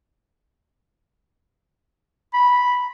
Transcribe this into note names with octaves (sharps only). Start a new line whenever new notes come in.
B5